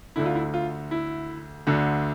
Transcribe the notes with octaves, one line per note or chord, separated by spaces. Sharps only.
D2 D3 E4
F4
E4
F4
E4
D2 D3